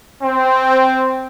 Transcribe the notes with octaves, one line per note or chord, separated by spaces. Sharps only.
C4